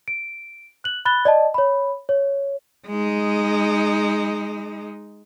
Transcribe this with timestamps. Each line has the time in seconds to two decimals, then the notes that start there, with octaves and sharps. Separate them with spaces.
0.08 D7
0.84 F#6 F#7
1.05 B5 F#6 A6 G7
1.25 D5 D#5 A5
1.54 C#5 B5
2.09 C#5
2.87 G#3 D#4